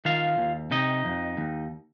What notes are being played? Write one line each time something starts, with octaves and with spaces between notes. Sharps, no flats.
D#3 F4 F5
D#2
C3 D#4 D#5
F2
D#2